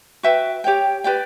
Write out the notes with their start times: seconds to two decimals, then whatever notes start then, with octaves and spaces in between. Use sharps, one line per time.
0.23 F#4 B4 E5 G5
0.64 G4 C#5 G5
1.04 G4 B4 D5 G5